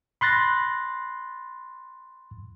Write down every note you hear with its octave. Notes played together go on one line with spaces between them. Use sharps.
B5 C6 F#6 A6 A#6